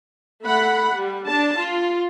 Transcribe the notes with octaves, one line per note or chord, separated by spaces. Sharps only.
A3 F#5 B5
G3
D4 A5
F4